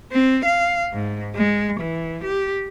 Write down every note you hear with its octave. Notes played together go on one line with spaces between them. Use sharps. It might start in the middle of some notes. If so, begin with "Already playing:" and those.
C4
F5
G#2
G#3
E3
G4